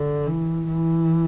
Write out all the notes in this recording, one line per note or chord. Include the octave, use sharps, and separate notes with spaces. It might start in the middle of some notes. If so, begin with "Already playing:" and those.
Already playing: D3
E3
E3